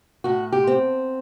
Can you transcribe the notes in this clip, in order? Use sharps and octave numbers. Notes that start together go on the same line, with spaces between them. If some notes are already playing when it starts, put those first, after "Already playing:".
A2 F#4
G4
C4